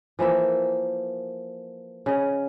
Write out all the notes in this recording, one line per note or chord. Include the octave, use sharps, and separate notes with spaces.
E3 F3 A#3 E5
C#3 D#5